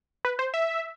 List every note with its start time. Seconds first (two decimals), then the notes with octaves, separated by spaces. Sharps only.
0.25 B4
0.39 C5
0.54 E5